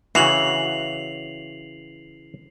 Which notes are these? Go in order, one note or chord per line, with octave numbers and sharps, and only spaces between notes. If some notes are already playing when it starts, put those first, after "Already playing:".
C#3 E3 F#4 C7 F7 F#7